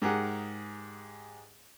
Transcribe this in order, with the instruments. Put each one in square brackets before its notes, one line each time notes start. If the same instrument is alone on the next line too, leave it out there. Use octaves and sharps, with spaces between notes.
[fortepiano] G#2 G4 G#4 A#4 F#5